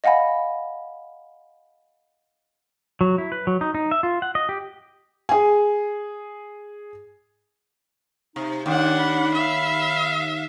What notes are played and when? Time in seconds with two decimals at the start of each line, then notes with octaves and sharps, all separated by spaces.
0.04 D#5 F5 F#5 G#5 B5
3.01 F#3
3.18 E4
3.32 B4
3.47 F#3
3.61 D#4
3.75 D#4
3.91 E5
4.03 F4
4.22 F#5
4.35 D#5
4.49 G4
5.29 G#4 G#5
8.36 C3 D#4
8.66 D#2 D4 F#5 G5
9.00 B5
9.34 E5 F5